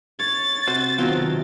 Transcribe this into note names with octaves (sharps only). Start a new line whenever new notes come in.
C#5 A6
C3 F#4 C5
B2 D#3 F#3 B3 C4 F4